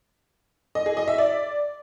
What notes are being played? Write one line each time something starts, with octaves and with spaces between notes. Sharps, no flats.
D#5
G#4
D#5
E5
D5